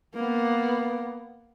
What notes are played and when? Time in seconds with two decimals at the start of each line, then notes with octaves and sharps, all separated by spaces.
0.14 A#3 B3